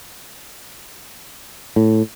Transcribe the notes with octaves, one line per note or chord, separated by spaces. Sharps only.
A2